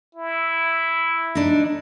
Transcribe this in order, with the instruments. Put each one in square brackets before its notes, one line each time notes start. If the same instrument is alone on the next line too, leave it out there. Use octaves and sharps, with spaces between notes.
[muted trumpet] E4
[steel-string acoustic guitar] D4 D#4